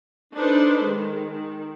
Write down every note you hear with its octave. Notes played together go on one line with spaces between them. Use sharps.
D4 D#4 A4 B4 C5
D#3 G#3
D#3